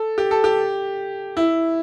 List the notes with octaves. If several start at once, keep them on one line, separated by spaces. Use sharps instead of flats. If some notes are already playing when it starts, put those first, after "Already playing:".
Already playing: A4
G4
A4
G4
E4